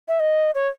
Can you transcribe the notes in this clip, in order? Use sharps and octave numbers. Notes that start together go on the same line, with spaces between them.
E5
D#5
C#5